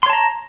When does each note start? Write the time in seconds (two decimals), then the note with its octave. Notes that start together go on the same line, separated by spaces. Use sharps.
0.03 C6
0.06 C#5
0.10 A5
0.13 A#5